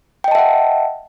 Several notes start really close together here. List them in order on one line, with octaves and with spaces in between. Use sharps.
G5 D#5 A5 E5 F#5